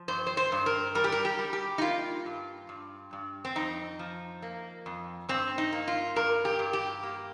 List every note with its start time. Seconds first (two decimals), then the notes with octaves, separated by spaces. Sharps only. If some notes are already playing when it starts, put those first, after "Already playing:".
Already playing: F3
0.08 G2 C5
0.27 C5
0.37 C5
0.52 G2
0.66 A#4
0.95 G3 A#4
1.04 G4
1.12 A#4
1.25 G4
1.39 G3
1.53 G4
1.78 D#4
1.82 A#3 F4
2.26 G2
2.69 G2
3.13 G2
3.45 C4
3.56 F2 D#4
3.99 F3
4.42 A#3
4.86 F2
5.29 G2 C4
5.58 D#4
5.72 A#3
5.88 F4
6.16 G2 A#4
6.45 G4
6.59 G2
6.73 G4
7.03 A#3